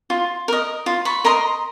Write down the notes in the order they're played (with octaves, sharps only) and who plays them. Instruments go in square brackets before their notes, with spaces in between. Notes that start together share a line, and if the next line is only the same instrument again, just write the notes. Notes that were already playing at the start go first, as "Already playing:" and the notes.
[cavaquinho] F4
A#4 D#5
F4
B5 C#6
A#4 D#5 A#5 C6